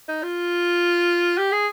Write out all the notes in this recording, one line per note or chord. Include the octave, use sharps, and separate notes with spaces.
D#4
F4
G4
G#4